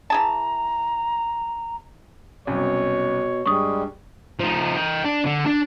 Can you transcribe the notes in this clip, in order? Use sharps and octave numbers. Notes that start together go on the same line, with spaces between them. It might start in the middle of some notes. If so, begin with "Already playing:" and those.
E3 G#4 A5 A#5
C2 F#2 B2 C#5
G2 G3 G#3 C#6 D#6
F3 D#4
D#5 G5
D4 D5
D3
D4